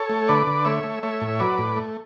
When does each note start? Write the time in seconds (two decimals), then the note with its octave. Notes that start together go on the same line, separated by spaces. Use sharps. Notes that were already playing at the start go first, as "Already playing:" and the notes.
Already playing: A4 C#5
0.09 A3
0.28 D3 B4 D5
0.47 D3
0.65 A3 C#5 E5
0.83 A3
1.03 A3 C#5 E5
1.21 A2
1.39 F#3 B4 D5
1.58 A2
1.76 A3